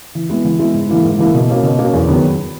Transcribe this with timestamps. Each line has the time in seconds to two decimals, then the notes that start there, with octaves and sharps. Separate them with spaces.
0.15 E3
0.29 G#3 B3 E4
0.44 E3
0.59 G#3 B3 E4
0.74 G#2
0.89 E3 A#3 E4
1.04 G#2
1.19 E3 A#3 E4
1.34 B2
1.49 A#3 C#4 F#4
1.63 B2
1.79 A#3 C#4 F#4
1.94 E2
2.08 D#3 F#3 B3